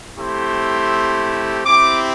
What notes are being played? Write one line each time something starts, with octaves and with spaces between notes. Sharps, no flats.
A3 C4 E4 G4 C6
C4 E4 G4 D6